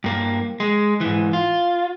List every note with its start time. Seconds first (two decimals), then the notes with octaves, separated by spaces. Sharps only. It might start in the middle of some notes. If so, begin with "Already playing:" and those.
0.04 G2 A#3
0.60 G#3
1.01 G#2 E3
1.33 F4